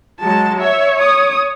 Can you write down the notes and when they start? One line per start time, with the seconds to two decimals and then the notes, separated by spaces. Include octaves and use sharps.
0.20 F#3 G#3 A5
0.60 C#5 E5
0.99 D#6